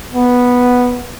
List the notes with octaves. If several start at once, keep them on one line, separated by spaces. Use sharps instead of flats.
B3